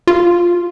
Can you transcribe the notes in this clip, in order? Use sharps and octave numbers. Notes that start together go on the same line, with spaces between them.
F4